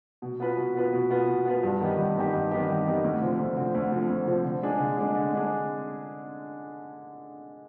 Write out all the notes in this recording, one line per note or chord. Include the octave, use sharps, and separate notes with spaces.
B2
B3 F4 B4
B2
B3 F4 B4
B2
B3 F4 B4
B2
B3 F4 B4
G2
D#3 B3 D#4 G4
G2
D#3 B3 D#4 G4
G2
D#3 B3 D#4 G4
G2
D#3 B3 D#4 G4
D2
D3 F3 C4
D2
D3 F3 C4
D2
D3 F3 C4
D2
D3 F3 C4
D3
G#3 D4 G#4
D3
G#3 D4 G#4
D3
G#3 D4 G#4